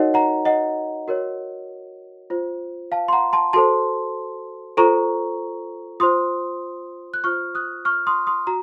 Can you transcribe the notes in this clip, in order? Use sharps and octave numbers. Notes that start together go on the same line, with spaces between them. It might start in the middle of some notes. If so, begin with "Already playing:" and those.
Already playing: D#4 F#4 A#4 C#5 D#5 F#5
F#5 A#5
D#5 F#5
F#4 A#4 C#5
F4 C5
F5 A5
C6
F#5 A#5
A5 C6
F#4 A4 C5 A5 C6
F4 A4 C5 A#5 C#6
F4 C5 C6 D#6
F#6
F4 C5 C#6 F6
D#6 F#6
C#6 F6
C6 D#6
C6 D#6
F#4 A#5